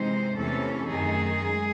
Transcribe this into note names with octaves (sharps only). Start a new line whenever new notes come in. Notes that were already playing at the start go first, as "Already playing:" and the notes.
Already playing: C3 E3 G#3 C4 D#4 C5
E2 C3 E3 A3 C#4 A4
F#2 D#3 A3 D#4 G#4
G#3